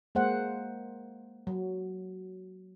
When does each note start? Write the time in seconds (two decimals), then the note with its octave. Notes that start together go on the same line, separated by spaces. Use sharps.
0.15 G#3 A#3 C5 F#5
1.47 F#3